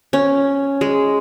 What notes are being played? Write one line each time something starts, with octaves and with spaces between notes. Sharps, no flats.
C#4
G#3